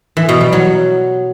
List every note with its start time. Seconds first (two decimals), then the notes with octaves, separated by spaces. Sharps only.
0.17 E3
0.29 B2
0.41 G3
0.53 F#3